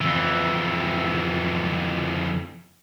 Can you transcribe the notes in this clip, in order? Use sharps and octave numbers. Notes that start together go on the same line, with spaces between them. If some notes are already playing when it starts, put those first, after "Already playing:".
F2 E3